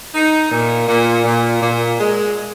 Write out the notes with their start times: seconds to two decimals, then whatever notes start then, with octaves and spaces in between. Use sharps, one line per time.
0.13 D#4
0.50 A#2
0.87 A#2
1.24 A#2
1.61 A#2
1.98 G#3